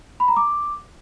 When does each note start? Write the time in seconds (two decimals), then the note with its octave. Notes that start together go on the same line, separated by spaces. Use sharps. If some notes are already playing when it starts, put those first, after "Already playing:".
0.20 B5
0.28 A#5
0.36 D6